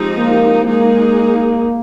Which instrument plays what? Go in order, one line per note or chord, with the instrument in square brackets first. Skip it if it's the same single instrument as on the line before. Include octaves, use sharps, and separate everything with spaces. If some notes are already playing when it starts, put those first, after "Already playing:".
Already playing: [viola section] F3 G#3 C4 D#4 G4
[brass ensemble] A#3
[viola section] G#3 D#4 G#4 [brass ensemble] A#3